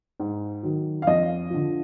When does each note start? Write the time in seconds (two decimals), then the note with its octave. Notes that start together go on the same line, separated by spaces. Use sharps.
0.20 G#2
0.63 D#3 F#3
1.02 F5
1.07 F2 D#5
1.50 D3 F3